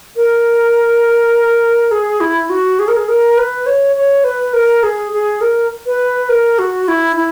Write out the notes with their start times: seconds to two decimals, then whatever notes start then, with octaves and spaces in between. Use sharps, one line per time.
0.16 A#4
1.91 G#4
2.21 E4
2.50 F#4
2.79 G#4
2.88 A#4
2.97 G#4
3.09 A#4
3.38 B4
3.66 C#5
3.96 C#5
4.24 B4
4.53 A#4
4.83 G#4
5.12 G#4
5.41 A#4
5.86 B4
6.29 A#4
6.59 F#4
6.88 E4
7.16 E4